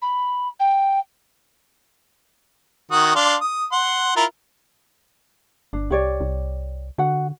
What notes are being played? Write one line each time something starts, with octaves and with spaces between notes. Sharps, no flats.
B5
G5
D#3 F#4 D#6
D4 F5 C6
D#6
F#5 C6
E4 F4 A#4
G1 D4
C2 G4 C#5 D5
C2
D3 F#4 F#5